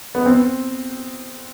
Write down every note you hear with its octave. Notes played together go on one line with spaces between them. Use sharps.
B3
C4